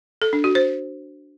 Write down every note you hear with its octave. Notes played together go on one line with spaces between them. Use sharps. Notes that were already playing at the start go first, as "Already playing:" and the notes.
A4
D4
F#4
C5